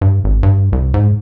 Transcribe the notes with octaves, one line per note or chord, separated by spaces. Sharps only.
G2
G#1
G2
C2
G#2